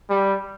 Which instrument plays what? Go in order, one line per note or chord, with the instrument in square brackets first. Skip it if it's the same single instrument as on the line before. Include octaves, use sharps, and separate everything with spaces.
[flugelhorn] G3